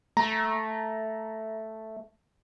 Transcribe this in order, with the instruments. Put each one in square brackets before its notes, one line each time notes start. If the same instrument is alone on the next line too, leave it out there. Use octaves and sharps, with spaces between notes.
[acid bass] A3 [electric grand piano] A#5